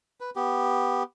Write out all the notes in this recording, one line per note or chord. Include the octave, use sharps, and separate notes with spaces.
B4
B3 G4